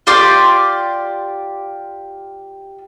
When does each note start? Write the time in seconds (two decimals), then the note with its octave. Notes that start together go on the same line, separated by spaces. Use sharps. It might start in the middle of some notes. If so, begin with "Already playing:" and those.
0.07 F4 G4 D5 C6